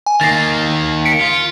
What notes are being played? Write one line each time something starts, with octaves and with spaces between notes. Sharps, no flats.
G#5
D#3 A#3 A6 A#6 C7
B6 C#7 D7
F4